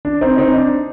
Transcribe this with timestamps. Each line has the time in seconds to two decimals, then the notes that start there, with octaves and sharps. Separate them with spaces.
0.05 D4
0.21 C4 D#4
0.38 C4 D#4
0.56 D4